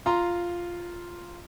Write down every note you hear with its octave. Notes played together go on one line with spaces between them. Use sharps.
F4 A#5 C6